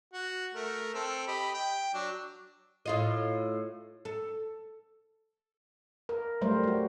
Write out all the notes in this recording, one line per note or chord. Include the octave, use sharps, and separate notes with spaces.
F#4
A3 A#4
C4 A4
G4 D#5 B5
G5
F#3 D4
A2 F4 D#5
A4
A#4
F#3 G3 A3 A#4 C5
G3 F#4